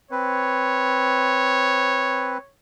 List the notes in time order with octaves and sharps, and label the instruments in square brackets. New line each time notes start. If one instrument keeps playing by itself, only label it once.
[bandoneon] C4 B4 [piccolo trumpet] C#5